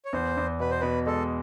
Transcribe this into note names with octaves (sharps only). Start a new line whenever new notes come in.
C#5
E2 C5
E2
B2 B4
C5
B2 B4
G#3 A4